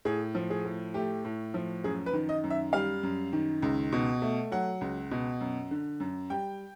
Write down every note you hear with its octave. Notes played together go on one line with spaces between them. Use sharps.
A2 G#4
F3
G#4
A2
A3 G4
A2
F3
F#2 G#4
B4
D#3
D#5
F#2
E5
G3 F5
F#2
D#3
C#2
B2
A3
F#3 F#5
C#2
B2
F#2
D3
F#2
G3 G5